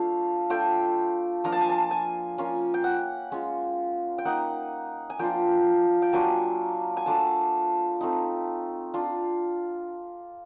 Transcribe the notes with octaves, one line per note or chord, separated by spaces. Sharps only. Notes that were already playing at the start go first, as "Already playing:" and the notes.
Already playing: A3 D4 F4 F5
A3 D4 F4 G5
F3 A#3 D4 F4 A#5
A5
G#5
A5
G#5
A#3 C#4 F4
G5
F#5
G#3 C#4 F4
G5
A#3 D#4 F#5
G#5
F3 A#3 D4 F4 G5
G5
F#3 A#3 D4 F4 G#5
G#5
A3 D4 F4 A5
A3 C4 D#4
D4 F4